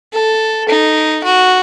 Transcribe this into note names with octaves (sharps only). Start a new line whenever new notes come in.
A4
D#4
F#4